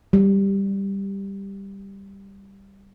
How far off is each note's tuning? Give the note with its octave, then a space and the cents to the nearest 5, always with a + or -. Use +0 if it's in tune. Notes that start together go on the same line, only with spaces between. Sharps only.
G3 +5